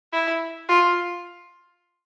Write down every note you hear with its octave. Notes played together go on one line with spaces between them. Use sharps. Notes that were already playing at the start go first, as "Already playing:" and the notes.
E4
F4